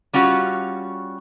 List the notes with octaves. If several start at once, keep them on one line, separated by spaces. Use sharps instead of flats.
G3 C#4 F4 F#4